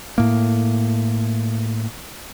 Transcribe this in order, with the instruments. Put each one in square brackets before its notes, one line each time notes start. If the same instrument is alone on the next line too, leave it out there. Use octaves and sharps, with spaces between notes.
[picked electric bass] A2 A#3